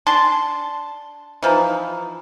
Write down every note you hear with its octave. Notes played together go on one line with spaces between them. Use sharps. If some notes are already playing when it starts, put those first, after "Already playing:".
D4 A5 C6
E3 F3 D#4